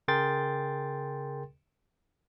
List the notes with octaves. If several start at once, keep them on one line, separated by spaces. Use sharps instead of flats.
C#3 G#4 A#4 G5 C6 A6